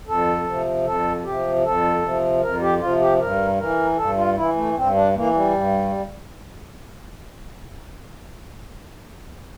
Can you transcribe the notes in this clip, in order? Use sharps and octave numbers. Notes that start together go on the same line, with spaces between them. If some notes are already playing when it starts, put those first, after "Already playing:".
F2 A4
C3 F3
F2 A4
C3 F3 G4
F2 A4
C3 F3
F2 A#4
G4
C3 F3 F4
G4
G2 A#4
E3 A#4
G2 A4
F4
E3 E4
A3
G2 C4
D4
E3 A#3
G3
G2